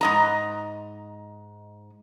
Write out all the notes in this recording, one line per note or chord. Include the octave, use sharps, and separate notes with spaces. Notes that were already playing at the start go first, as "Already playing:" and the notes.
G#2 D#5 A#5